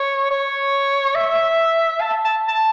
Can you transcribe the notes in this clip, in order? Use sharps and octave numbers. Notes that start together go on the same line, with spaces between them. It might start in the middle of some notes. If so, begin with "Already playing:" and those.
Already playing: C#5
C#5
E5
A5
A5
A5